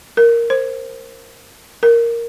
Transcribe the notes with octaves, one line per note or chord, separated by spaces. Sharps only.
A#4
C5
A#4